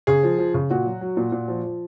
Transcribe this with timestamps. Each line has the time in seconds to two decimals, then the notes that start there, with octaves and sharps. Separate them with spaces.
0.07 C#3 G#4
0.23 F3
0.38 F3
0.54 C#3
0.70 A#2 F#4
0.86 F#3
1.01 F#3
1.17 A#2
1.32 A#2
1.48 F3
1.64 F3